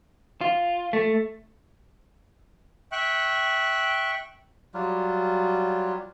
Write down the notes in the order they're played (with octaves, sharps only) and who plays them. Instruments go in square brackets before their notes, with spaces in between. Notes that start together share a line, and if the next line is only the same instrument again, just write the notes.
[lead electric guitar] F4
A3
[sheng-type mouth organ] E5 G5 C#6 F#6
[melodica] F#3 G3 F4